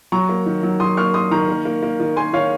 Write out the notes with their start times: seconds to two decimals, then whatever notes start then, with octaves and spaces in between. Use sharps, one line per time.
0.12 F#3 A#5 C#6
0.29 A#3
0.46 D#3
0.63 F#3
0.80 F#3 C6 D#6
0.97 A#3 C#6 F6
1.14 A#3 C6 D#6
1.31 D#3 A#5 C#6
1.49 A#3
1.65 A#3
1.83 A#3
2.00 D#3
2.16 A#3 G#5 C6
2.33 D#3 C#5 F5